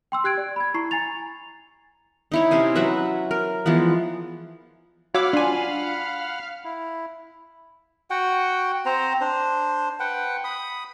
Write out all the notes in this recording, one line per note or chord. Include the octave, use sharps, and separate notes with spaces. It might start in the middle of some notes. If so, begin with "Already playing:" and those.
G5 C6 E6
G4 F#6 G#6 D7
D5
B5 G#6
E4 A#5 C#6 C7
G#5 A#5 A6 F7
D#4 E4 C#5
C3 C#4 C5 G#5
F#3 F#4 B4 E5
A#4
E3 F3 G#3 B3
F#4 C#5 F5 F#5 B5 D6 E6
D4 F4 G#5
E4
F#4 F#5 G5
C4 C5 A#5
D4 C5
B4 F#5 G5
B5 D#6